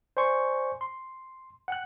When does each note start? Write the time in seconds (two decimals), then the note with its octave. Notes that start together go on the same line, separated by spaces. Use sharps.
0.17 C5 D5 G#5 C6 C#6
0.81 C6
1.68 F#5 G5 F#6